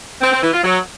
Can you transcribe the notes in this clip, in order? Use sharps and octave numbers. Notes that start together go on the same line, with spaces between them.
C4
C4
E3
F4
F#3